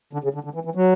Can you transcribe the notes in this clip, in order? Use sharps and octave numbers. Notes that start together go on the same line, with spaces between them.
D3
C#3
D3
D3
E3
E3
F#3